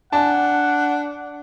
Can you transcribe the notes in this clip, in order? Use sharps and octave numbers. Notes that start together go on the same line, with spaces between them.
D4 F#5 G#5 A5